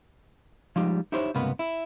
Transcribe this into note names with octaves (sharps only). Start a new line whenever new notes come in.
F3 G3 G#3 D#4 G4
D#4 E4 G4 C5 C#5
C#2 G2 C3 A#3 B3 B5
E4